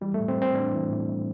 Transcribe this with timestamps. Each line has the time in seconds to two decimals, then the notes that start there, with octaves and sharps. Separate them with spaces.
0.01 E3 G3
0.14 A3
0.20 A2
0.28 C4
0.36 G3
0.42 C4
0.54 A2 D4
0.73 E3
0.89 A2
1.07 G3